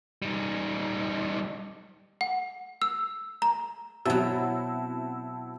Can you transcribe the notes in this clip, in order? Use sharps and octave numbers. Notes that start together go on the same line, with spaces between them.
G3 D#4
F#5
E6
A#5
B2 F#3 C4 E4 F#4 A5 E6